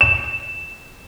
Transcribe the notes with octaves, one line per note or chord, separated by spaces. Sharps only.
E7